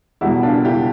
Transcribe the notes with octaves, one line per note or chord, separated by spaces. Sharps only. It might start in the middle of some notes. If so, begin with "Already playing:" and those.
E2 B2 G3 E4
D4 F4
E4 G4